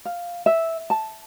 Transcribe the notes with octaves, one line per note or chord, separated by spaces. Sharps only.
F5
E5
A5